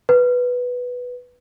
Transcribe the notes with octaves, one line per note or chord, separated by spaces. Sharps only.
B4